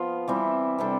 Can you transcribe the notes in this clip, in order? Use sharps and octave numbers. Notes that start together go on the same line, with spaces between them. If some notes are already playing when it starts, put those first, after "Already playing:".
Already playing: F3 B3 F4
E3 G3 C4 E4
C3 G3 D4 A4